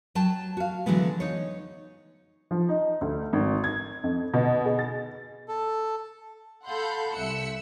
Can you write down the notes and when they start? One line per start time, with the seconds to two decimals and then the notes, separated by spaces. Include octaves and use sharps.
0.15 F#3 G5 A5
0.57 F#4 F5
0.86 D3 E3 F#3 G#3 B3
1.20 D#4 C#5
2.51 F3
2.69 D#4
3.01 D2
3.33 G#1
3.64 G#6
4.04 F2
4.34 B2
4.65 G#4
4.79 A6
5.48 A4
6.64 A4 F5 F#5 B5 C6 G6
7.16 C2 E5 E6 F#6 C#7